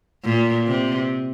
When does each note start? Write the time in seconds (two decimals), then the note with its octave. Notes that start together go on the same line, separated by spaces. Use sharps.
0.25 A#2
0.67 C3